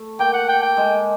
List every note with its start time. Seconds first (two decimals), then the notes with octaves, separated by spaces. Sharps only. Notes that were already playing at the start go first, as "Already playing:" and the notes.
Already playing: A3
0.19 A#3 G5
0.34 F#5
0.49 G5
0.63 G5
0.77 G#3